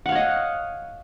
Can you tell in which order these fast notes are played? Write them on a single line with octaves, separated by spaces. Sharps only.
F#5 F5 C#5 D#5